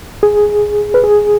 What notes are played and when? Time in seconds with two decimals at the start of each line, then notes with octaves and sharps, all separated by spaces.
0.23 G#4
0.94 B4
1.04 G#4